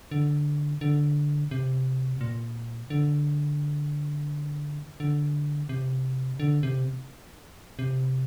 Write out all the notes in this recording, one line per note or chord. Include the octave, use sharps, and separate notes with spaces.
D3
D3
C3
A#2
D3
D3
C3
D3
C3
C3